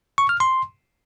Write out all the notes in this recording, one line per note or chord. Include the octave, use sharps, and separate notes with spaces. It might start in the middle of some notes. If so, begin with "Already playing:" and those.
C#6
F6
C6